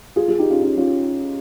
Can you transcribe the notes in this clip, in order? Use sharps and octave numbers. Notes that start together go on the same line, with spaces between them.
F4 G#4
F4 G#4
D#4 G4
C#4 F4
C#4 F4
C#4 F4